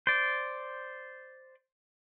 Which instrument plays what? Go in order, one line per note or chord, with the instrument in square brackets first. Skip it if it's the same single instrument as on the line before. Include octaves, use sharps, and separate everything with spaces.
[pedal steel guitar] C5 D5